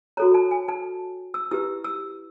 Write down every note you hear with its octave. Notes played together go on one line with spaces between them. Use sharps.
F#4 A4 C#5 A#5
A5
G#5
A5
E6
E4 G4 B4 E6
E6